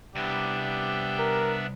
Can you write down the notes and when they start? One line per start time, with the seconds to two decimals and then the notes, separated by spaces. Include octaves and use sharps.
0.15 C2 B3 D4 G4 E5
1.19 A#4